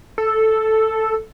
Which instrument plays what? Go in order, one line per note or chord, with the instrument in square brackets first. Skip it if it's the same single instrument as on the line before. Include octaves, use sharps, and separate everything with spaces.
[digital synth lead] A4